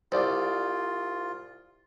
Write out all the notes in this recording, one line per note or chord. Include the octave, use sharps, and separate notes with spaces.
C2 F4 C5 D5